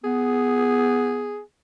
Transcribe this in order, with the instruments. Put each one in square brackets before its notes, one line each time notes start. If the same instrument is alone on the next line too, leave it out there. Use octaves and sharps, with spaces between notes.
[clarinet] B3 [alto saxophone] G#4